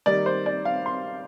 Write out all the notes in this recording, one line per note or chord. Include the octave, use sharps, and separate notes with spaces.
D#3 G3 A#3 D#4 D5
C5
D5
F5
C6